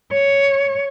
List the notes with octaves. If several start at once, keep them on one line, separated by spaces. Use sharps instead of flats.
C#5